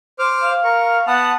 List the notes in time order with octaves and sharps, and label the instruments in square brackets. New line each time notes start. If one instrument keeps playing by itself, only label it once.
[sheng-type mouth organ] C5 D6 F6
[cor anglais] F5
[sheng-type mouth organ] A#4 C#6
[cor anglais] B3 [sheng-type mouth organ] F#5 A5